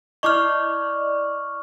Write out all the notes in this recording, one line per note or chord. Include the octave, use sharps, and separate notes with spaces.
E4 D5 D#5 C#6 D6 F6